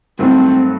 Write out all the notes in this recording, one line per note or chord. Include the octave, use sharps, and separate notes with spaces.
G2 D#3 F#3 A3 C4